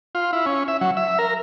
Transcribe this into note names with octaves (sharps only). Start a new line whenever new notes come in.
F4
E4
C#4
E5
F#3
E5
A#4